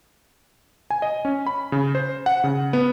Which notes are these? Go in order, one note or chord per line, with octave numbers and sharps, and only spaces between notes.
G#5
D#5
C#4
B5
C#3
C5
F#5
C#3
B3